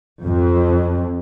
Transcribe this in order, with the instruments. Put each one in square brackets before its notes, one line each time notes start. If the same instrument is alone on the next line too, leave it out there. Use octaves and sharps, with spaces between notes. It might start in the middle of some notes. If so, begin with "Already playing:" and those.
[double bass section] F2